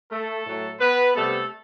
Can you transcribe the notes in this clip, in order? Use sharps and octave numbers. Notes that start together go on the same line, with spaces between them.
A3 A4
A2 F#3 A3
B3 B4
C3 G3 A3 B3 A4